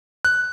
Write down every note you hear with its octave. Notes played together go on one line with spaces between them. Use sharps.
F#6